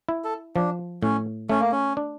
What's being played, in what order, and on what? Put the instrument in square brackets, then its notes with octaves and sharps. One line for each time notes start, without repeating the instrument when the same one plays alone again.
[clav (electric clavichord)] E4
[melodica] A4
[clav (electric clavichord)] F3 [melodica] D4
[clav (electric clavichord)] A2 [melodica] C#4
[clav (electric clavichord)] A3 [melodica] C#4
[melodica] A#3
C#4
[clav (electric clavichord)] D4